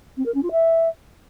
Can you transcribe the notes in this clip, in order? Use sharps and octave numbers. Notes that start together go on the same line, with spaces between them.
C4
A#4
C#4
F4
E5